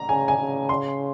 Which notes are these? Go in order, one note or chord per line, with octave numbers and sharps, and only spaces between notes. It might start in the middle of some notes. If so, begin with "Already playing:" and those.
Already playing: A#5
C#3 G#5
G#5
C#3
C6